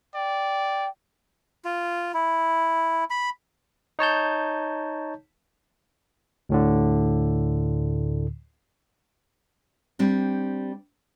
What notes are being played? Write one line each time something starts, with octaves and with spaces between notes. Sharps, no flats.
D5 G5
F4
E4
B5
D#4 C#5 A5 G6
D2 A2 D3
G3 C4 D4